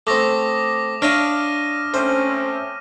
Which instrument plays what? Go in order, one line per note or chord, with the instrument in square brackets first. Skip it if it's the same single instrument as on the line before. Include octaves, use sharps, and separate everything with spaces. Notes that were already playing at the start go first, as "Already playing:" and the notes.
[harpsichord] A3 C4 [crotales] D6 D#6 A#6
[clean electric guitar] D4 [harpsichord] C#5 E5 F5 [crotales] F6 A#6 D#7
[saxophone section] A3 C4 C#4 [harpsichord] C5